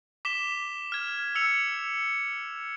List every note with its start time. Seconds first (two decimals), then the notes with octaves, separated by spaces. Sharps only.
0.25 D6 B6 E7 G7
0.92 F6 G#6
1.35 E6 C#7 F7